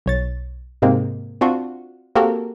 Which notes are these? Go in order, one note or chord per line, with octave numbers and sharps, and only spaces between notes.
B1 C#5 A6
G#2 C3 G#3 A#3 C4
C4 D4 F4 F#4
A#3 C4 F#4 G4 A4 A#4